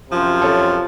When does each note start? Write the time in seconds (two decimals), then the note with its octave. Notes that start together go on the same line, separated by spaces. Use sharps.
0.10 F#2 C3 F3
0.42 A4 C#5